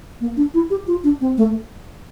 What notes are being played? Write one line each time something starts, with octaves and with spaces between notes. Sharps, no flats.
A#3
D4
E4
G4
F4
D4
C4
A3